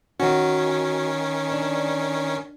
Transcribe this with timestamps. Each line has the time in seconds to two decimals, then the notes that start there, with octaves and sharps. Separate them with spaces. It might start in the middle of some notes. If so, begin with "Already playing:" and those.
0.19 D#3 C#4 F#4
1.51 D4